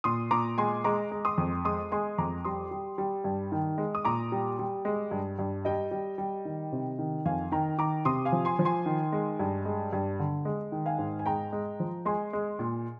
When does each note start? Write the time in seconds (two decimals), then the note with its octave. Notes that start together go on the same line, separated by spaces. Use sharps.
0.04 A#2 C6 D#6
0.31 A#2 A#5 D6
0.58 G#3 G#5 C6
0.84 G#3 A#5 D6
1.11 G#3
1.25 C6 D#6
1.38 F2
1.65 G#3 C6 D#6
1.92 G#3 G#5 C6
2.18 F2 A#5 D6
2.45 G3 C6 D#6
2.71 G3
2.98 G3
3.24 G2
3.52 D#3
3.78 G#3
3.95 D#6
4.05 A#2 A#5 D6
4.32 G3
4.59 G3
4.85 G#3
5.11 G2
5.39 G2
5.65 G3 D#5 G5
5.91 G3
6.18 G3
6.45 D#3
6.72 C3
6.99 D#3
7.25 F2 F5 G#5
7.52 D#3 G5 A#5
7.78 D#3 A#5 D6
8.05 C3 C6 D#6
8.25 F5 G#5
8.32 F3
8.45 G#5 C6
8.59 F3
8.65 G#5 C6
8.86 D#3
9.12 G#3
9.39 G2
9.65 G#3
9.93 G2
10.19 D3
10.45 G#3
10.72 D#3
10.86 F5 G#5
10.99 G#2
11.19 G#5
11.26 G#3 G5 A#5
11.52 G#3
11.80 F3
12.05 G#3 G#5 C6
12.33 G#3
12.59 A#2